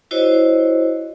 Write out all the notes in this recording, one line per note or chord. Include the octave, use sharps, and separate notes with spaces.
E4 F#4 C5 C#5 D#5